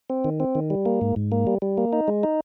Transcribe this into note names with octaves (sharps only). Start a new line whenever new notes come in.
C4
D#3
C4
D#3
G3
A#3
G#2
G#2
A#3
G3
G3
A#3
D#4
G#3
D#4